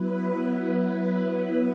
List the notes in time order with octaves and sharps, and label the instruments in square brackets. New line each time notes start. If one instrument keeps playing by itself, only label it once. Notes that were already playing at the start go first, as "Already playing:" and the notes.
Already playing: [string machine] F#3 B3 E4 B4